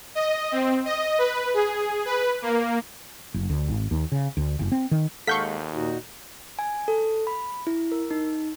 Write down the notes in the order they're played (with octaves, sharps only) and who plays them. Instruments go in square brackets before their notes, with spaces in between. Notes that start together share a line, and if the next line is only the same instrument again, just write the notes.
[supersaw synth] D#5
C4
D#5
B4
G#4
B4
A#3
[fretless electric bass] F#1
D2
G#1
D#2
C#3
D2
F#1
C4
D#3
[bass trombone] D#2 [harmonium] G#3 [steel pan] A4 F5 F#5 [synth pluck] C#6 G6 B6
[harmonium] A#2 D#4 F#4
[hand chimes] G#5
A4
B5
E4
A#4
D#4